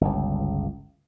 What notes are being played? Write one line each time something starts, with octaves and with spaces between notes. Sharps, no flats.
G1 C#2